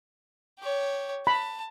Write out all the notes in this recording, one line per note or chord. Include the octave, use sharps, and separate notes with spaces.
G4 C#5
A5 B5